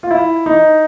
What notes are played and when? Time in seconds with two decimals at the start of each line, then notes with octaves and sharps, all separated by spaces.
0.03 F4
0.11 E4
0.46 D#4